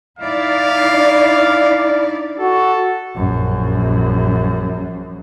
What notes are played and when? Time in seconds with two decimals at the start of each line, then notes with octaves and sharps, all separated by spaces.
0.19 D#4 E4 D5 F5
0.94 D4
2.40 F#4 A4
3.16 A#1 F#2